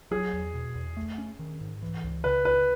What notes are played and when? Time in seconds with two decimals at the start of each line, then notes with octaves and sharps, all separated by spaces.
0.11 F#3 G#4
0.33 E2
0.54 B2
0.75 E2
0.97 A3
1.18 C#4
1.39 D#3
1.61 G#2
1.82 E3
2.04 C#2
2.24 C#3 B4
2.45 C#2 B4